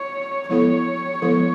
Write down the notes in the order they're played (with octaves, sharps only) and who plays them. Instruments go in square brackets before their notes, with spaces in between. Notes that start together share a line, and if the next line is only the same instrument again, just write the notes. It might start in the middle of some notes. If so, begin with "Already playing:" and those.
Already playing: [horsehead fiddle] C#5
[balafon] F3 G#3 B3 E4 A4 [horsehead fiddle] C#5
[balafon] F3 G#3 B3 E4 A4